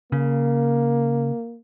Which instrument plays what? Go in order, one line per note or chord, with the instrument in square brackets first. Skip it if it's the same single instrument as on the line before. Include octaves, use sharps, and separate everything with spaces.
[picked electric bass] C#3 [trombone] A#3